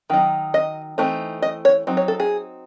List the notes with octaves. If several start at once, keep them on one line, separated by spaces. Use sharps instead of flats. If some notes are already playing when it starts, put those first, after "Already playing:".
D#3 F#3 D#4
D#5
E3 A3 C4 D#4
D#5
C#5
F#3 C4 D#4
C#5
A4
G#4